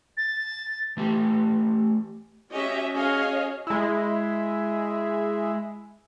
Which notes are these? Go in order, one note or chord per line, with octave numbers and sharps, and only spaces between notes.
A6
E3 A3 G4
C#4 F#4 G4 C#5 D#5 E5
C#4 F#4 G#4 C#5 D#5 F5
G#3 E4